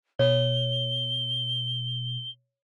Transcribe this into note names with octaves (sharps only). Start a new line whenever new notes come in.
B2 C#5 G7